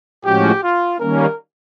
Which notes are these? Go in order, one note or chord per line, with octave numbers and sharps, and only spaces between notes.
A2 F3 G#3 C#4 F#4 G4
F4
D#3 G3 A#3 C#4 A#4